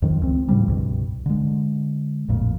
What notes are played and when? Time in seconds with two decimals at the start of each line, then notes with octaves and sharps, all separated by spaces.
0.02 F2 D#3 F3
0.22 C#2 C4
0.48 A2 C#3 F3 G3
0.68 C2 G2 B2
1.26 D3 G#3
2.28 A1 F2 A#2